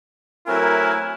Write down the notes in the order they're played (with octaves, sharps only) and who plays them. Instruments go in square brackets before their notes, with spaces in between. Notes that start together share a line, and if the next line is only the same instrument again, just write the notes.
[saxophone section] F#3 A3 C4 [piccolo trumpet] E4 [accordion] A#4 [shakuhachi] G#5